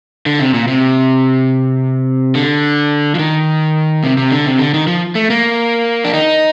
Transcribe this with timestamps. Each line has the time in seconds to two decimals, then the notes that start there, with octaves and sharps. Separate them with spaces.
0.26 D3
0.40 C3
0.54 A#2
0.67 C3
2.35 D3
3.15 F3
3.19 D#3
4.04 C3
4.17 C3
4.32 D3
4.46 C3
4.59 D3
4.74 D#3
4.87 F3
5.15 A3
5.30 A#3
6.04 D4
6.13 D#4